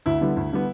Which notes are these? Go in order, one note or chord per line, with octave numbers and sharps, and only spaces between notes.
D2 E4
D3 G3 B3
D2
D3 G3 B3